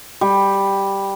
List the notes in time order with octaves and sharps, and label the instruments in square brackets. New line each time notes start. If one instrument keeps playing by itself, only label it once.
[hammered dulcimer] G3